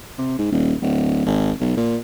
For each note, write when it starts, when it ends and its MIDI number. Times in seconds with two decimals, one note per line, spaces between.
0.18 0.36 48
0.38 0.47 44
0.52 0.74 27
0.82 1.24 26
1.26 1.52 32
1.60 1.76 35
1.77 1.97 46